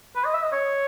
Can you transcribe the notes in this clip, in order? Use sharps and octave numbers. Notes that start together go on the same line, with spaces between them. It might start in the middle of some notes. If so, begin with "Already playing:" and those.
B4
D#5
E5
D#5
C#5